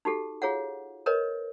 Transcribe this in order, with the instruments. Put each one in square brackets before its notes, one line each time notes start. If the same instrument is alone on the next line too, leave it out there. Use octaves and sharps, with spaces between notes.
[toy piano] D#4 F#4 G4 A4
F4 G#4 C#5 F5 F#5
A#4 B4 C#5 D#5